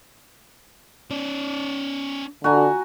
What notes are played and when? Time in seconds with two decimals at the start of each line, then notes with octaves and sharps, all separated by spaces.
1.11 C#4 D5
2.44 D3 F#4 G#5 A#5